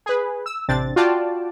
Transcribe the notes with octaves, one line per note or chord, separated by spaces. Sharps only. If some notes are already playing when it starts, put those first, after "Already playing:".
G#4 B4
E6
A1 C3 C4 D4 A6
F4 F#4 D5 G5 A5